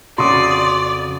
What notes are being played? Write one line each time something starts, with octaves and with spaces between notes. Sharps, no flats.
F2 C#3 F#4 D5 C6 C#6 D#6